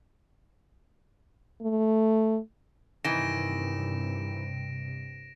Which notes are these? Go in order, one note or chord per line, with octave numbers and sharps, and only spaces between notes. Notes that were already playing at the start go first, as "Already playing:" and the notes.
A3
G2 C3 D#3 E3 A#6 D7 E7